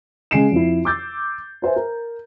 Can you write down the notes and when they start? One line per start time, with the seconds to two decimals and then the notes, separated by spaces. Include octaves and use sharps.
0.31 C#3 G#3 G#5 C7 D7 E7
0.52 F2 E4
0.85 D6 E6 G6 A6
1.62 B4 C5 E5 G#5
1.76 A#4